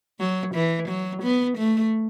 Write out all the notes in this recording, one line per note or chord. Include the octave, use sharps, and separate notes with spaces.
F#3
E3
F#3
B3
A3